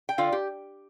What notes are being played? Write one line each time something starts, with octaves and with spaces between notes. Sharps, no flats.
G5
D3 F4 F5
G4